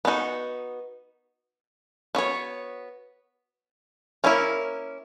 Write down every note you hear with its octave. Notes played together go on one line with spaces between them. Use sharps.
B3 D#4 F#4
B3 F#4 C#5
A#3 C#4 E4 A#4